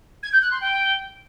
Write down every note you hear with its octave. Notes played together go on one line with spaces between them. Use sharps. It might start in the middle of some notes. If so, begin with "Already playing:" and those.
G#6
G6
F#6
C6
G5